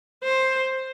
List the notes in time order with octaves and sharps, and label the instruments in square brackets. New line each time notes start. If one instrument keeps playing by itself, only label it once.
[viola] C5